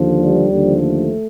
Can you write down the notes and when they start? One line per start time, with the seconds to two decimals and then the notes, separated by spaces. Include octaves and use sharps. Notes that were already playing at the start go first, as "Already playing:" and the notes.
Already playing: D#2 D3 F3
0.18 G3
0.50 D#2 D3 F3
0.81 A3